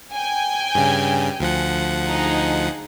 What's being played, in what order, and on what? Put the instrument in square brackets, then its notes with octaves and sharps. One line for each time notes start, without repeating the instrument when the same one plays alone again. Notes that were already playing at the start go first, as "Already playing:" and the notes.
[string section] G5 G#5
[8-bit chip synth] G2 C#3
D2 F3 F#5
[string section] D#4 G#4